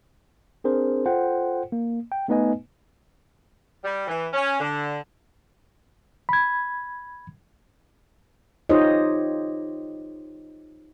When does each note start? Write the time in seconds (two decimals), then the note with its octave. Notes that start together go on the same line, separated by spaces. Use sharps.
0.64 C4 D4 G#4 A#4 C5
1.06 F4 A4 C5 F#5 G5
1.72 A#3
2.12 G5
2.28 A3 B3 D#4 B4 D#5 G#5
3.84 G3
4.07 E3
4.33 C#4
4.60 D3
6.29 B5 G#6
8.69 D#4 F4 G4 C5 C#5 D#5